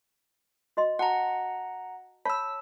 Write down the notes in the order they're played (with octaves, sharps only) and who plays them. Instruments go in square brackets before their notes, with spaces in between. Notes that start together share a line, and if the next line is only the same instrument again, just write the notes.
[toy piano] F#4 D#5 C6
[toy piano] F#4 A5 [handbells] F#5 A#5
[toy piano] C#5 A5 B5 [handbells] E6 B6